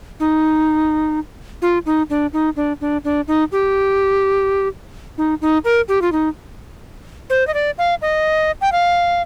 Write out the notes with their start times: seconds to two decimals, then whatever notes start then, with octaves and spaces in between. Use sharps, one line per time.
0.20 D#4
1.62 F4
1.86 D#4
2.10 D4
2.33 D#4
2.56 D4
2.81 D4
3.04 D4
3.27 D#4
3.52 G4
5.18 D#4
5.41 D#4
5.64 A#4
5.88 G4
6.02 F4
6.12 D#4
7.30 C5
7.47 D#5
7.54 D5
7.78 F5
8.02 D#5
8.61 G5
8.72 F5